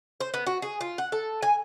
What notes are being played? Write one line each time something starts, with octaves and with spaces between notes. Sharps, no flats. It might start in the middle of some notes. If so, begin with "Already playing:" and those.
C5
B3
F#4
G#4
F4
F#5
A4
G#5